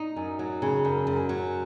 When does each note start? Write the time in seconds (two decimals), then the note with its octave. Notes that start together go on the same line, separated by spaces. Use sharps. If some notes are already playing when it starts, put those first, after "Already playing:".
Already playing: D#4
0.16 F#2
0.39 F#3
0.62 C#3
0.85 F#2
1.07 F#2
1.29 F#3